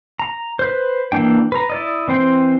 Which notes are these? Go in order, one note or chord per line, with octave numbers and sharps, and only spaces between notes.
A#5
B4 C5
E3 A#3 D4 G5
B4 A#5
E4 D5 D#5
E3 C4 C5 G5